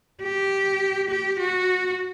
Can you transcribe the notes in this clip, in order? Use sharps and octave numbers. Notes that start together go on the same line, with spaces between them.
G4
G4
F#4